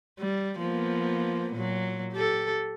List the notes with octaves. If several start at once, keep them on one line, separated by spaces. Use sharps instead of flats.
G3
F3 A#3 B3
A#2 F#3
G4 A4